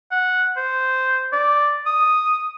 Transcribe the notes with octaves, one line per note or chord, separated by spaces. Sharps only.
F#5
C5
D5
D#6